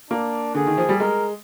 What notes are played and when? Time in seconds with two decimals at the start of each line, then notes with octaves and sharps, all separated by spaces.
0.11 A#3 D4
0.55 D3 G#4
0.67 D#3
0.77 F3
0.89 G3
1.00 G#3 A#4